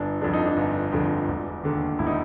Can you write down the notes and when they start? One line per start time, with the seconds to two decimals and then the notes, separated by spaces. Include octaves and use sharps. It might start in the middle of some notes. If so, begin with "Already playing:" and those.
Already playing: G1 D4
0.21 F2 D3 D4
0.33 D#4
0.46 D4
0.57 G1
0.92 F2 D3
1.28 E1
1.64 D#2 D3
1.99 E1 E4
2.07 D#4